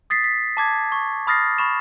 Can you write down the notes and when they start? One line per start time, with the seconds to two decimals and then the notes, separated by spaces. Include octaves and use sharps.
0.10 D#6 A6 B6 C7
0.24 B6
0.57 A5 D6 G#6
0.92 C#6
1.27 B5 D#6 F6 A6 A#6 C7
1.58 B5 C#6 E7